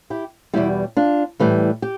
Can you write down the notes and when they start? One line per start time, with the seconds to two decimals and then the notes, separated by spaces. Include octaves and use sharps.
0.10 E4 G4
0.53 E2 B2 G3 E4 G4
0.97 D4 F4
1.40 A2 E3 G3
1.82 G4